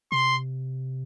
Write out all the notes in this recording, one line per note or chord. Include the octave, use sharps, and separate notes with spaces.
C3 C6